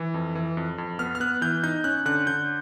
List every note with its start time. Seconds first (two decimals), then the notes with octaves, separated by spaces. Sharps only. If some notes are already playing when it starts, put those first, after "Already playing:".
Already playing: E3
0.14 F2
0.35 E3
0.57 F2
0.78 F2
0.99 B3 F6
1.15 F6
1.20 B3 F#6
1.41 E3 G6
1.63 D#4 G6
1.84 C#4 F#6
2.05 D3 F#6
2.27 D3 G6